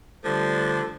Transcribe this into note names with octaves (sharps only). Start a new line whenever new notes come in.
D3 F3 G3 A3 D4